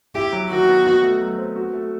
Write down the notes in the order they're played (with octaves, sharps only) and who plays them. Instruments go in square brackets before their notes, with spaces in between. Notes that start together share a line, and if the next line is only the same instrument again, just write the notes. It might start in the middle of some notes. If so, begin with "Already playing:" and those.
[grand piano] E4 [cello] G4
[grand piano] F#3
[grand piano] D#3 [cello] F#4
[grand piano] B3
D#4
A3
F#3
C4
F#4
A3